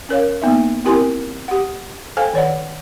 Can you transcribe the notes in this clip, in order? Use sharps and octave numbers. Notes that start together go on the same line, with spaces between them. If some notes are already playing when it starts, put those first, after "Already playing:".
C#4 A#4 C#5 F5
A#3 B3 D#4 E5
C4 E4 G4 A#4 G#5 C6
G4 F#5
A4 C5 F5 G5 G#5
D#3 C#5 D5 F#5